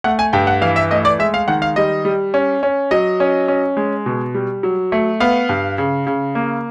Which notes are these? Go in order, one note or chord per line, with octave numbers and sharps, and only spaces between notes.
A3 F#5
G#5
G2 G5
F#5
E3 F5
E5
A3 D#5
D5
G#3 E5
F5
D#3 F#5
F5
G3 D#5
G3
C#4
C#4
F#3 D#5
C#4
C#4
G#3
B2
G3
F#3
A3
B3 F5
G2
C#3
C#3
A#3